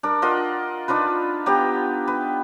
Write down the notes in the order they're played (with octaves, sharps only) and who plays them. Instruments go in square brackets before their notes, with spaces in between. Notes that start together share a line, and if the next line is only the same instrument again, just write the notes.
[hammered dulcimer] D4 A#4
F4 A#4 D#5 F#5
D4 D#4 F4 B4
B3 G4 G5 A#5
B4